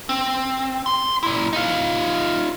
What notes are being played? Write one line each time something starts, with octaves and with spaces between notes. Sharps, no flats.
C4
C6
A#2 E4
D#4 F4